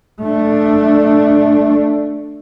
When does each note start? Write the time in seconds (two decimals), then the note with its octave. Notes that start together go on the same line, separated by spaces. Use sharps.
0.22 A3 D4